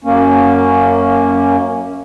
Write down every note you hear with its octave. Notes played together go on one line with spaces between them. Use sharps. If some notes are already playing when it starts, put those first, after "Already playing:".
F#2 A#3 C#4